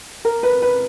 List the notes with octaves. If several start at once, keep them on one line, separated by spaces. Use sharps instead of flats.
A#4
B4
B4